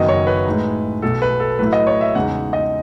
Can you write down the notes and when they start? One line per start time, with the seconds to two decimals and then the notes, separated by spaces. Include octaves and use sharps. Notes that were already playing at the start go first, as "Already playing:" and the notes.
Already playing: F#1 F#2 D#3 F#3 B3 D#5
0.08 C#5
0.27 B4
0.46 A2 G#3 D#4
1.02 B1 B2 A3 A4
1.22 B4
1.40 A4
1.59 A2 F#3 A3 E4 B4
1.73 D#5
1.87 C#5
2.01 E5
2.15 E2 C#3 G#3 D#4 F#5
2.53 D#5